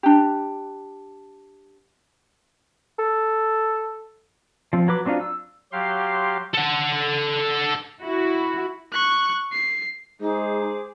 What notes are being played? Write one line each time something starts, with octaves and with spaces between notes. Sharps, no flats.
D4 G4
A4
F3 C4
F#3 B4 D6
F#3 C4 D4 D#4 F4
E6
F#3 G4 F5 C6
A4 F#5
E4 F#4
C#6 F#6
C7
G#3 D#4 G#4 C5 D6